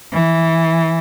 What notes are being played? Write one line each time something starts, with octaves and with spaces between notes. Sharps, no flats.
E3